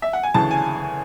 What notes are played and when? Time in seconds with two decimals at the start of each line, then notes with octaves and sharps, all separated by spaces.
0.02 E5
0.13 F#5
0.23 G#5
0.34 D2 C#3 E3 A5
0.51 G#5